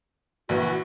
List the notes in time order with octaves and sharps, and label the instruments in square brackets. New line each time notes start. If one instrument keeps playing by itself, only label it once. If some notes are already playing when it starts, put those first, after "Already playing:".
[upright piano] A#1 E3 [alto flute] F#4